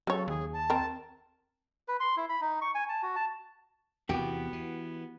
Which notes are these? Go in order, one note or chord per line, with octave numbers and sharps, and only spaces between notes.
C#3 F#3 A4 C#5
D#2 G#4
A5
C4 A#4
B4
C6
E4
B5
D#4
C#6
G#5
A5
F#4
A5
E2 C3 E3 B3 F#4 G4
E3